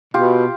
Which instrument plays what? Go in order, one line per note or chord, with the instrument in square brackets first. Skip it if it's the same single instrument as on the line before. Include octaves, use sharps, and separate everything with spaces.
[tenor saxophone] B2 [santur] F4 G4